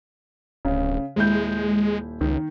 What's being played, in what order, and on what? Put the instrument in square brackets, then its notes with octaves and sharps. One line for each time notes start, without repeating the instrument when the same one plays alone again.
[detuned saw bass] D1 [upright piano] C#3
[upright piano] D#1 E4 G6 [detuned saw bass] G#3
[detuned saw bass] C#2 [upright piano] D#3